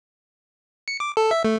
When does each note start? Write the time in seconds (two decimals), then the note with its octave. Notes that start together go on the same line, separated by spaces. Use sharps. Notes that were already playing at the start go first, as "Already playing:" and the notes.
0.88 C#7
1.00 D6
1.17 A4
1.31 E5
1.45 A3